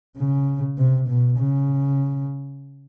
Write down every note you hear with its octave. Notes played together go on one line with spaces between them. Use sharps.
C#3
C3
B2
C#3